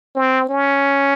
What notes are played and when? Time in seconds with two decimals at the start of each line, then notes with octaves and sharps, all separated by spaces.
0.16 C4
0.49 C#4